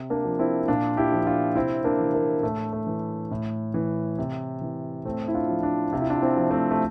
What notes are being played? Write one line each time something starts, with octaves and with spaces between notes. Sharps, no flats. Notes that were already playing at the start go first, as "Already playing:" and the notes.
Already playing: C3
A#3 D4
F3
C4 E4
A#2 D4 F4
E4 G4
F3
D4 F4
C3 C4 E4
A#3 D4
E3
A#3
A2 A3
A3
E3
A2
E3
C3
E3
A2 A3 C4
E4
D4 F4
F3
D4 F4
C3 F4
E4
D4 F4
C4 E4
F3
A3 C4
A3